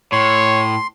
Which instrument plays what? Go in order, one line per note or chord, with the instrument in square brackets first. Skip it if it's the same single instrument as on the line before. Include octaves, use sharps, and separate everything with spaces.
[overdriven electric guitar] A2 [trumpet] C#5 [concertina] C6